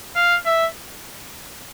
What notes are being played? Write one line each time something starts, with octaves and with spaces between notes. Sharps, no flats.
F5
E5